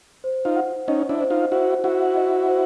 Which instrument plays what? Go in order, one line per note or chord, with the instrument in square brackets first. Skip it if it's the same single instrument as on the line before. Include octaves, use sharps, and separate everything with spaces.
[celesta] C5
[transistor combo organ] D#4 F4
[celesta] F#5
[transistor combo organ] C#4 D#4 [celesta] D#5
[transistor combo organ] D4 E4
[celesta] C5
[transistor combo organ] D#4 F4
[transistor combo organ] E4 F#4 [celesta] C5
[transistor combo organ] E4 F#4 [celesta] F#5
[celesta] D#5
C5